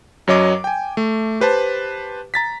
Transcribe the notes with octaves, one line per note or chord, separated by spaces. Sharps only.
F#2 F#3 C#5 D#5 D6
G5 G#5
A3
G4 B4 C5 A5
A#5 A6 B6